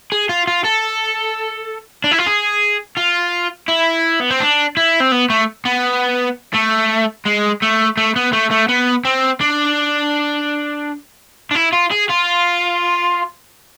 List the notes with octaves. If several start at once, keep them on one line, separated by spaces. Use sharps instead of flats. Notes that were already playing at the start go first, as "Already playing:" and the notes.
G#4
F4
F4
A4
D4
E4
F4
G#4
F4
E4
B3
C4
D4
E4
C4
B3
A3
B3
A3
G#3
A3
A3
B3
A3
A3
B3
C4
D4
D4
E4
F4
G#4
F4